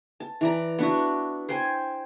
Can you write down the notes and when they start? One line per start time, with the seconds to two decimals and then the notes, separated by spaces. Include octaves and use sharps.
0.20 A5
0.41 E3 D5 A#5
0.79 B3 D4 E4 F#4
1.49 C5 G5 G#5